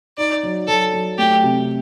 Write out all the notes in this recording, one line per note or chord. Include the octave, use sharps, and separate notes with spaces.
D#4 D5
F#3
F#3 A4
F#3
A3 G4
C3